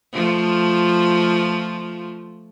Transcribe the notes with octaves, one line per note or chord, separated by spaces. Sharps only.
F3 A3 F4